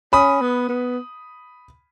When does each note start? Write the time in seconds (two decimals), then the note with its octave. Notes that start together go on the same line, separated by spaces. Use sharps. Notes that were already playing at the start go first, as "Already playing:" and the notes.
0.13 C#4 B5 D#6
0.41 B3
0.69 B3